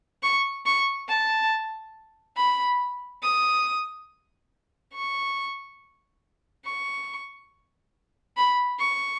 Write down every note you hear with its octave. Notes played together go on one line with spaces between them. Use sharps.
C#6
C#6
A5
B5
D#6
C#6
C#6
B5
C#6